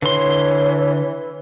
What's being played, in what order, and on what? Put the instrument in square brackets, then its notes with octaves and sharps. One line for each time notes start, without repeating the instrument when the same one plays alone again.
[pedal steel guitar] D3 C6 [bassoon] E3 [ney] C#5